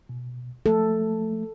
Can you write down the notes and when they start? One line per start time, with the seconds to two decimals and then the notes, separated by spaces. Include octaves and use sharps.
0.09 B2
0.66 F3 A3 A4